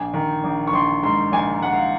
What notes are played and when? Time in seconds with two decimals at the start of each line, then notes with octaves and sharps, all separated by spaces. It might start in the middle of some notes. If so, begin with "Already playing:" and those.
Already playing: A#1 G#5
0.14 D#3
0.44 A#1
0.67 C#6
0.73 A#1 C6
1.03 G#2 C6
1.32 A#1 G#5
1.62 G#2 F#5
1.74 F5